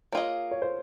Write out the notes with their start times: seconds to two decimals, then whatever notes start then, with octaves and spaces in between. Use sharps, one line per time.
0.12 A#3 F4 G#4 C#5 D#5
0.51 C#5
0.62 C5